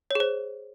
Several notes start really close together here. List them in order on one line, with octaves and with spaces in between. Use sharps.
C#5 G#4 C5